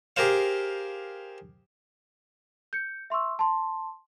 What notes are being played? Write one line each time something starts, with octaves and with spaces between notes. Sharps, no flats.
G4 G#4 A#4 C5 F5
G6 C#7
E5 C6 C#6 E6
A5 C6